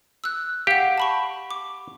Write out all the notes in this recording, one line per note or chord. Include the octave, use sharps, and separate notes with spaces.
E6 F#6
G4 F5 F#5
A5 B5 C#6
D6